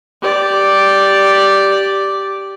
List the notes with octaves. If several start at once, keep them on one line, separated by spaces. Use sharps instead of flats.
G4 D5